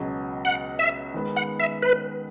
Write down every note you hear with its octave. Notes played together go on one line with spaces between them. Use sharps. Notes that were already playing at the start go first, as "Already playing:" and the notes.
Already playing: C#2 B2 F#3
F#5
E5
D#3 G#3 B3
F#5
E5
B4